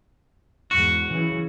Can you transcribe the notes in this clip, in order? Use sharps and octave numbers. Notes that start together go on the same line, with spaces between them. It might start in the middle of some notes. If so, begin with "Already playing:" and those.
E2 G#2 F#4
C#3 E3